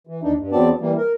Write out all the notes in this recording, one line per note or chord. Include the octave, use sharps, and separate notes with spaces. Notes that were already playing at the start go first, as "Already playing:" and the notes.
E3
D#2 D4 D#4
G2
E2 F#3 B3 C4 D5 A5
E3 G3 A#3
A#4